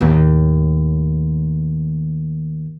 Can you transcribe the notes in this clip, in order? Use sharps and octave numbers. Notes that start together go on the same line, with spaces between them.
D#2 A2